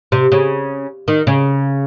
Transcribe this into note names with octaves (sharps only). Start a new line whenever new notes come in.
C3
C#3
D#3
C#3